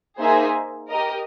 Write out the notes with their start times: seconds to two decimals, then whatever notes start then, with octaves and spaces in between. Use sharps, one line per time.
0.20 A#3 D#4 G#4 C5 E5
0.89 G4 A#4 D#5